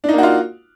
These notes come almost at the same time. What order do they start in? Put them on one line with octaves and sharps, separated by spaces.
D4 D#4 A#3 F#4 F4